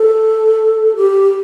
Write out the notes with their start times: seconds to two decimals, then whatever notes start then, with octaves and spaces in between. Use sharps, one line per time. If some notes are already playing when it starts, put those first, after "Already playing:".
Already playing: A4
0.96 G4